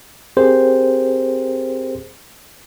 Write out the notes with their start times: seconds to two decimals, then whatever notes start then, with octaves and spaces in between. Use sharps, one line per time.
0.37 C4 G4 G#4 A#4 C5